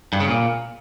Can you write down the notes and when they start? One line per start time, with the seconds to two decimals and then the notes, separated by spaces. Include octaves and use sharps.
0.13 G2
0.20 C#3
0.28 A#2